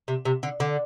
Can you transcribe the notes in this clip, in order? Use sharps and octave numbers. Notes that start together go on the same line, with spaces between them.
C3
C3
D3
D3